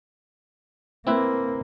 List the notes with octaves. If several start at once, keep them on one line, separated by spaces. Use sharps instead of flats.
A#3 C4 E4 B4